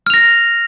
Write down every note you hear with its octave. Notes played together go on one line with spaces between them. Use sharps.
F6 A#6 F7